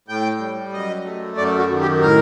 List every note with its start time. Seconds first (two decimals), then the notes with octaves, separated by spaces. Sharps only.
0.08 A2 G5
0.40 G3
0.73 F#2 D#5
1.05 A3
1.37 F#2 D5
1.58 F#4
1.70 D#3
1.80 G4
2.02 A2 A#4